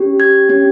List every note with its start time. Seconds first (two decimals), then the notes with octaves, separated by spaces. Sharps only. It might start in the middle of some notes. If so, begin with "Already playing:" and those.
Already playing: C#4 G4
0.20 G#6
0.49 C#4 G4